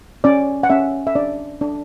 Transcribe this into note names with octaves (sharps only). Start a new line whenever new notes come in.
C#4 D5
F#5
C#4 E5
E5
D4 D5
D4